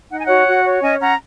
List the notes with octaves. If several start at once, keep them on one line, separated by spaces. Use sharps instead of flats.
D#4 F#5
G#5
F#4 C#5 F#5
F#4
C#5
C#4 D#5 G#5
C#4 F#5 A#5